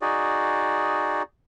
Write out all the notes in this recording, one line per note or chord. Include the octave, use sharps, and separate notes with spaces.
D#4 F#4 G#4 D5